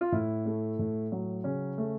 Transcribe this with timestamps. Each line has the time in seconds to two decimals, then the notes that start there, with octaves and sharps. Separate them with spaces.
0.01 F4
0.12 A2 E4
0.46 A3
0.79 A2
1.12 F#3
1.44 C#3 C#4
1.78 A3